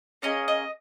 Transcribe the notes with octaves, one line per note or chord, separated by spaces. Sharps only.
A#3 C#4 G#4 D#5
D#5